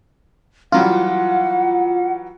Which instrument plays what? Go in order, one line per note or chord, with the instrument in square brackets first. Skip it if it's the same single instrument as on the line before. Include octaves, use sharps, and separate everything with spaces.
[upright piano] E3 F#3 G3 [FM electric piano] F4 [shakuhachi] F#5